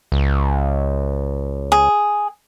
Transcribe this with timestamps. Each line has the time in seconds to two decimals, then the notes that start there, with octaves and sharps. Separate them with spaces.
0.12 C#2
1.72 G#4